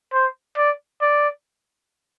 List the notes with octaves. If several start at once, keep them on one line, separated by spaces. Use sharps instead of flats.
C5
D5
D5